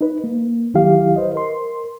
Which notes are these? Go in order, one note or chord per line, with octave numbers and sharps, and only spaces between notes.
D#4 B4
A#3
C2 D#3 F#3 E4 G4 F5
B4 C5 D#5
A#4 C6